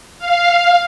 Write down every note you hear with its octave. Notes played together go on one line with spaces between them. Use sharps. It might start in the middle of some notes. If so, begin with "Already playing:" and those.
F5